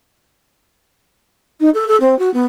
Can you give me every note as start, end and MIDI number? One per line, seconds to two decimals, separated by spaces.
1.60 1.70 63
1.74 1.87 69
1.88 1.96 69
2.00 2.17 60
2.19 2.32 66
2.33 2.45 59